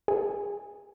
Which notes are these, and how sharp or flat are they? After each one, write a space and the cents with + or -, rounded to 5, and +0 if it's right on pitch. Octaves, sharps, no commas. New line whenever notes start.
G#4 -30